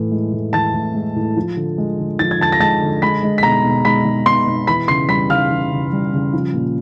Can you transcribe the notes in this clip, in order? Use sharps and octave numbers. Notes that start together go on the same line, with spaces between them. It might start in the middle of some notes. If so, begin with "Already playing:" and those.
Already playing: A2 E3
G#3
A2
E3 A5 A6
A2
G#3
A2
F3
D3
G#3
D3
F3 A6
G#6
D3 A5 A6
A#6
G#3 A5 A6
D3
G#3 B5 B6
G#3
B6
B2 A#5 A#6
B2
G#3 B5 B6
G#3
B2 C6 C7
B2
E3 B5 B6
C#3 C6 C7
G3 B5 B6
C#3 F5 F6
E3
C#3
G3
C#3
F3
A#2